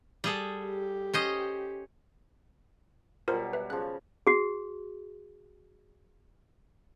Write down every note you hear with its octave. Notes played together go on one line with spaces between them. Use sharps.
G3 G#4 A4
G4
C#4 C5 D#5
B2 F#3 G3 F4 A#4 C5
B4 E5
C#3 F3 F#6
F#4 G#4